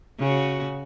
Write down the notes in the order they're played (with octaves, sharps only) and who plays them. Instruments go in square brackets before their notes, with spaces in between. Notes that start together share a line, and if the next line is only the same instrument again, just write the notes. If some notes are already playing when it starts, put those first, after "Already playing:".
[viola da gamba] C#3 F#4